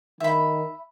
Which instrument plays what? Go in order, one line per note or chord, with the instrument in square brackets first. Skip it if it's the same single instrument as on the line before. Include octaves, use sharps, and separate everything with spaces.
[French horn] D#3 [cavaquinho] E5 B5